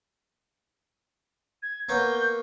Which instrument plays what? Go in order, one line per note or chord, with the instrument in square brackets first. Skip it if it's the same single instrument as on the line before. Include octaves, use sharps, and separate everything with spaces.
[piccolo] G#6
[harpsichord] A#3 B3 C#5 [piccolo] G6